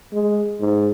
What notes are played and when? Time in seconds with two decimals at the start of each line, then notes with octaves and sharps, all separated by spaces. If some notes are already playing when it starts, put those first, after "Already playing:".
0.13 G#3
0.60 G#2